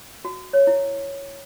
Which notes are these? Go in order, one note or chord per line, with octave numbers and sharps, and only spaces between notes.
F#4
C#5
E4